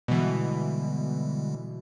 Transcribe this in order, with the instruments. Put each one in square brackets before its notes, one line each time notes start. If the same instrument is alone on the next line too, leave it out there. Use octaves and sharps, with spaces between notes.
[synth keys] B2 E3 [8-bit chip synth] D3 G3 G#3